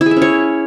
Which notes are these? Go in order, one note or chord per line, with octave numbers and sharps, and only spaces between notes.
E4
G#4
E5
C#4
C#5